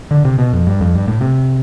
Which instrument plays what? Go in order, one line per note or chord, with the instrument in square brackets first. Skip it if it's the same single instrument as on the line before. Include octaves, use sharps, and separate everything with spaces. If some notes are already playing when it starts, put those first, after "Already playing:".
[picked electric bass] D3
C3
B2
F2
G2
F2
G2
A2
C3